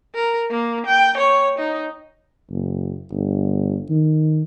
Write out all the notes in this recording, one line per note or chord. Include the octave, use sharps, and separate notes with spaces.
A#4
A#3
G5
C#5
D#4
F#1
G1
D#3